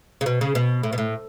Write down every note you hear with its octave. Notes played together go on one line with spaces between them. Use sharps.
C#3
B2
C#3
B2
A2
B2
A2